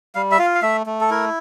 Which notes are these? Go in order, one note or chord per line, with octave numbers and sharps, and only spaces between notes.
G3 F5
E5
F4 F5
F5
A3 E5
A3
A4
E4 A#4